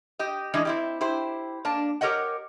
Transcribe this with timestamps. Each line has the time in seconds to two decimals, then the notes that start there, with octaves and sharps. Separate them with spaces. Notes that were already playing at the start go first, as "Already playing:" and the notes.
0.19 G4 D#5
0.54 E3 G#3 C#4 D4 D#5
0.65 C4 E4 G4
1.01 E4 G4 C5
1.65 A#3 D4 A5
2.01 G4 A#4 C#5 D#5 F#5